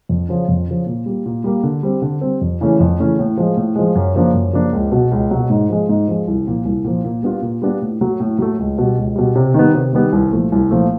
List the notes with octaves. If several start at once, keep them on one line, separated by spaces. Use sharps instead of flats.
F2
C#3 F3
F2
C#3 F3
A#2
G3 A#3
A#2
G3 A#3
D3
G3 C4
D3
G3 C4
F2
C#3 E3 A3 C#4
F2
C#3 E3 A3 C#4
A2
F3 G#3
A2
F3 G#3
F#2
C#3 F3 A#3 D4
F#2
C#3 F3 A#3 D4
C#2
B2 F#3
C#2
B2 F#3
G#2
F3 G#3
G#2
F3 G#3
C2
A#2 F3
C2
A#2 F3
A#2
G3 B3 D4 F4
A#2
G3 B3 D4 F4
A2
F#3 A3
A2
F#3 A3
C#2
B2 G3
C#2
B2 G3
C3
D#3 G3 B3
C3
D#3 G3 B3
C2
A#2 F3 A3
C2
A#2 F3 A3